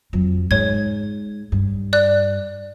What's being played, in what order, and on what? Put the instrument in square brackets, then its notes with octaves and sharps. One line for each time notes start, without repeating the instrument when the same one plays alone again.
[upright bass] F2 F#3
[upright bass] G#2 [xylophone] C#5 G#6
[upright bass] G2
[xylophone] D5 F#6